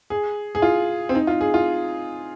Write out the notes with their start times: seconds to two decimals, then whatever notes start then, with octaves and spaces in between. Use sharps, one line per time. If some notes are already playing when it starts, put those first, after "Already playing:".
0.10 G#4
0.55 G#4
0.62 F4
1.09 C4
1.15 D#4
1.27 F4
1.41 G#4
1.54 F4